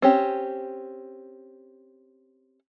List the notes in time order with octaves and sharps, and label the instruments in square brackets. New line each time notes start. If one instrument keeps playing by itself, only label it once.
[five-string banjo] C4 C#4 G4